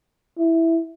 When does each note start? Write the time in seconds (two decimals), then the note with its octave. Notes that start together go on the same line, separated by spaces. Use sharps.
0.37 E4